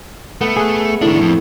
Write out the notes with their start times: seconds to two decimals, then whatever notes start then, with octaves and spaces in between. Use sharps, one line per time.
0.41 A3 B3
0.56 G#4 B4
1.02 A2 D#3 D4
1.21 F2